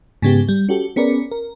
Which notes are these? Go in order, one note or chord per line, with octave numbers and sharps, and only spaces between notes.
G#2 C#3 G#3 B3 G4
G3
C#4 F#4 G4 A4
B3 C#4 G#4 A#4 B4 D5
A#4